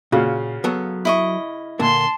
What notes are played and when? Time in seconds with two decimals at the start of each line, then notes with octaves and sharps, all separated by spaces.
0.12 A#2 C#3 F4 F#4
0.64 F#3 B3 A4
1.05 E4 D#5 C#6
1.79 A#2 D3 A#3 A5 C6